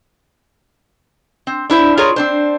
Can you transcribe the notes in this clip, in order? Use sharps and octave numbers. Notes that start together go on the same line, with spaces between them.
C4
D4 E4 C5
F4 G#4 A#4 C#5
C4 D4 C5